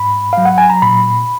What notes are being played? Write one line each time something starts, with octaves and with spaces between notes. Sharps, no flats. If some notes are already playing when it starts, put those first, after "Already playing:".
Already playing: G#2 B5
F#3 F5
F#5
G#5
A#5
A#2 B5